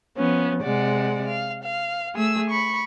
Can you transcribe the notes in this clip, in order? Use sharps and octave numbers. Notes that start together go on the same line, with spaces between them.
F3 B3 C#4
C3 G#3 D5 F#5
F5
F5
A3 G#4 E6
B5 C#6